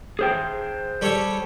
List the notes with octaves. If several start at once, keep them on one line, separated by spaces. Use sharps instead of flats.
G#4 C5 G5
G3 A4 C#5